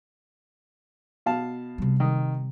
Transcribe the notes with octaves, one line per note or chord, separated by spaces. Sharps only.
B2 F5 A5
C3 G3
D#3